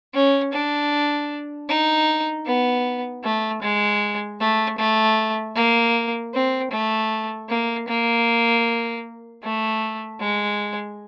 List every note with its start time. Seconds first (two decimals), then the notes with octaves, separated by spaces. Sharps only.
0.14 C#4
0.53 D4
1.69 D#4
2.46 B3
3.24 A3
3.62 G#3
4.40 A3
4.78 A3
5.56 A#3
6.34 C4
6.72 A3
7.49 A#3
7.88 A#3
9.43 A3
10.21 G#3